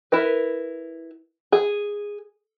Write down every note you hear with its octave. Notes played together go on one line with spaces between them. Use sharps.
E4 A#4 B4
G#4